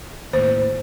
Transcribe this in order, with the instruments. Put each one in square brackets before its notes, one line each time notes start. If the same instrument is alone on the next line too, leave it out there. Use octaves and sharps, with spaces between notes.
[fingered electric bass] D#2 A2 [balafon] C5